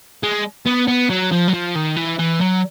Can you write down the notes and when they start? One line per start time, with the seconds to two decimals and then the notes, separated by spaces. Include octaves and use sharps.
0.23 G#3
0.66 B3
0.87 B3
1.10 F#3
1.32 F3
1.48 F#3
1.54 F3
1.76 D#3
1.97 E3
2.19 E3
2.41 F#3